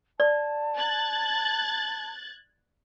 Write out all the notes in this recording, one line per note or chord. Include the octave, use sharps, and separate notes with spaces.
D5 A5
F#6 G#6 A6